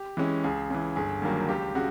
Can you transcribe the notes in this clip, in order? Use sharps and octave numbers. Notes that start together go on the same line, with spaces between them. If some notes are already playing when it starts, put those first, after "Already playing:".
Already playing: G4
E3 G#3 C#4
C#2 G#4
C#3 E3
G1 G#4
G2 D#3 F#3 A#3
C#2 G4
C#3 F#4